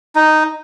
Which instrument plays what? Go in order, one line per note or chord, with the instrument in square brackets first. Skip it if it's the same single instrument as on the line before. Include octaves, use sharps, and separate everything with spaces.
[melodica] D#4